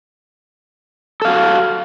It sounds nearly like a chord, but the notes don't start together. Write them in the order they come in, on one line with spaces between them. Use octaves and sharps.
A4 F5 F#4